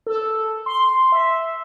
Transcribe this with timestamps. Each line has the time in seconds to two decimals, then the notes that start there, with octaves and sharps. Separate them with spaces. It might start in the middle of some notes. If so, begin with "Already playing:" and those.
0.07 A4
0.66 C6
1.12 E5